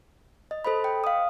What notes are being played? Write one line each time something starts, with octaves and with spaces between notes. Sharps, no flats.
D#5
A4 C5 D#5 B5
G5
F5 D#6